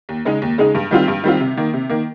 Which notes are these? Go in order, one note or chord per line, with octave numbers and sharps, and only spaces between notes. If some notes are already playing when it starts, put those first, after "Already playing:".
D#2
C#3 G#3 D#4
D#2
C#3 G#3 D#4
G2
D#3 G3 C4 F4
G2
D#3 G3 C4 F4
C3
D#3 A#3
C3
D#3 A#3